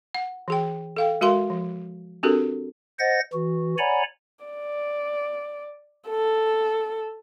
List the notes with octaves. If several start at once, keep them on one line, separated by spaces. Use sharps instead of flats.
F#5
E3 G#4 G5
A4 F5 G5
G#3 F#4 A#4 F5 C6
F3
C4 D4 F#4 G4 A4 A#4
C5 D#5 F#5 A6 A#6
E3 F#4
C#5 D5 F#5 G#5 A#5 B5
D5
A4